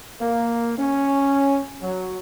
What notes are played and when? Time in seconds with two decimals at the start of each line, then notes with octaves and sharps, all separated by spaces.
0.21 A#3
0.78 C#4
1.81 F#3